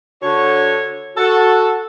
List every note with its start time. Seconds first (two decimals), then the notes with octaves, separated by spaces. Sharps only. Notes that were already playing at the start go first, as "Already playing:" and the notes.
0.22 D3 F#4 A4 C#5
1.18 F#4 A4